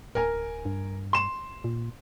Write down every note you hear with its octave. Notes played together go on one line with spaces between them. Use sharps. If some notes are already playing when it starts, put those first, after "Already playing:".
D1 A#4 G#5
G2
C6 E7
A#2